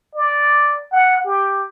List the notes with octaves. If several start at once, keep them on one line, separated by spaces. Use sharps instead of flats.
D5
F#5
G4